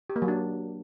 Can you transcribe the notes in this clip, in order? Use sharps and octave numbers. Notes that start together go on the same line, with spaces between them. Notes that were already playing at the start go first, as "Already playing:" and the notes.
G4
A#3
F#3
D4